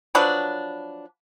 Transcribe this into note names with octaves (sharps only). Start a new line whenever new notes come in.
F3 F#3 D4 B4